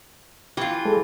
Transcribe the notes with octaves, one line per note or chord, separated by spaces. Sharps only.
E3 F4 G4
G#3 A4